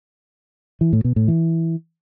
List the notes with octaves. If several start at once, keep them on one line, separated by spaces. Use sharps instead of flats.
E3
A2
B2
A2
E3